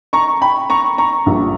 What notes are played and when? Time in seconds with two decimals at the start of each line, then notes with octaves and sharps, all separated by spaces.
0.13 A#5 C#6
0.41 G5 B5
0.70 A#5 C#6
0.98 A#5 C#6
1.26 A#1 A#2 G3